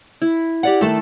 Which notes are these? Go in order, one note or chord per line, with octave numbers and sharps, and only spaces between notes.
E4
G4 D5 F#5
D#3 A3 D4 A4